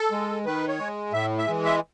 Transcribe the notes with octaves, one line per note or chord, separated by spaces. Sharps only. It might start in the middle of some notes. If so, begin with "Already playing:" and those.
Already playing: A4
G#3
D#3 B4
C#5
G#3
A2 E5
E5
E3 G#3
E5